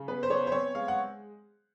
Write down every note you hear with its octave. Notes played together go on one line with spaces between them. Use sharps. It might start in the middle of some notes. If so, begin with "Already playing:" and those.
Already playing: C#3
B3 B4
C5
B3 C#5
C5
C4 C#5
G#3 F5
F#5